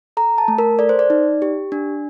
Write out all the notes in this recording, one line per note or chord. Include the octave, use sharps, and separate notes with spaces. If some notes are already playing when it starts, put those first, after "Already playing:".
A4 A#5
A5
A3
A#4
A4 D5
C5
D5
D#4
G4
D4